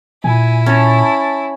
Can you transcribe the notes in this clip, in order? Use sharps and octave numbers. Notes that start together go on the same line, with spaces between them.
A#2 E4 G#5
C#4 A5